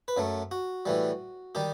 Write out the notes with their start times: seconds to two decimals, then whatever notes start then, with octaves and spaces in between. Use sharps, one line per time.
0.08 B4
0.17 F#2 F#3 A3
0.51 F#4
0.86 A2 E3 G3
1.55 D#3 G3 G4